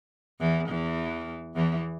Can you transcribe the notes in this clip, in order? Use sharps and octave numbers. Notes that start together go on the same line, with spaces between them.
E2 E3
E2 E3
E2 E3